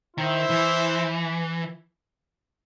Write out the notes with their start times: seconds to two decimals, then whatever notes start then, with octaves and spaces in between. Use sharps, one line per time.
0.17 D#3 E4 C5 E5
0.50 E3